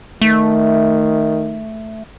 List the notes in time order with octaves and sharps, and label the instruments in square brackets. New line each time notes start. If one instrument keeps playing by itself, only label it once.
[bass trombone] D#3 [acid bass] A3